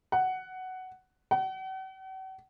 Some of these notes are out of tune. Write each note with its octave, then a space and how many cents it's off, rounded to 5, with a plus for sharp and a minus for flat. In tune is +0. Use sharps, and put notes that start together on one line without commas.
F#5 +10
F#5 +45